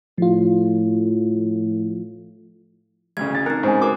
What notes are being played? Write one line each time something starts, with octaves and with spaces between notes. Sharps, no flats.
A2 F3 F4
A1 D2 C#3 G#6
A6
C4 D#4 A#4
G#2 C#3 C5 G#5
F#4 A#4 B4 D6